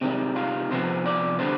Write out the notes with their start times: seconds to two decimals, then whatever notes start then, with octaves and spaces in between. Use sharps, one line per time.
0.01 C3 D#3 G3 C4
0.36 F4
0.71 C3 F3 B3 C5
1.06 D5
1.39 D3 G3 B3 C5